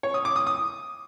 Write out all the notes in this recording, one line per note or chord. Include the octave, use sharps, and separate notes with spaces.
C#5
D#6
D6
D#6
D#6